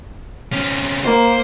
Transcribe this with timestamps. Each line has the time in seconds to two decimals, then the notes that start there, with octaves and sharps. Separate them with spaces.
0.52 C3 C#4
1.04 A#3 C5